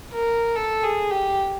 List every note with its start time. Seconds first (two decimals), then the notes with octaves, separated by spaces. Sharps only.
0.13 A#4
0.56 A4
0.83 G#4
1.11 G4